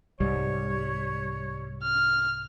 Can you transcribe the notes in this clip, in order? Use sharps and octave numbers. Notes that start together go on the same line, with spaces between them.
C2 G#2 G3 C#5
F6